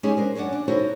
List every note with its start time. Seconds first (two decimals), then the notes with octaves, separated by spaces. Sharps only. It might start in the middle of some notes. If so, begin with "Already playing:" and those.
0.03 G#3 C#4 D#4 G4 G#4
0.17 D4 A#4 C5
0.35 F#2 C#4 D4 D5 F#5
0.53 D4
0.68 D#4 E4 F#4 A4 C5 C#5